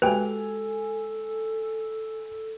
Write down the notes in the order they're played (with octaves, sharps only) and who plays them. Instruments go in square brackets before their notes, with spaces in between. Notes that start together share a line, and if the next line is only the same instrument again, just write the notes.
[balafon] G#3 F#4 G4 [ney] A4 [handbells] B4 G5 [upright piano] G#5 F7